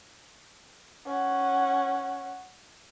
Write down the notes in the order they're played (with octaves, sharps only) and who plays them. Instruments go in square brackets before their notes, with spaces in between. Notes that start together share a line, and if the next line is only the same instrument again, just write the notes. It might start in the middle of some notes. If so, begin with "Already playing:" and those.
[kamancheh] C#4 F#5